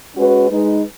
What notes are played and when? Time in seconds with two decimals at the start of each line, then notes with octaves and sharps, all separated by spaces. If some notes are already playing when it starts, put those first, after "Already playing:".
0.16 G#3 C#4 F#4 B4
0.49 G#3 D#4 B4